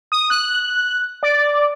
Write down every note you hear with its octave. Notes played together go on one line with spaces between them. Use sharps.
D#6
F#6
D5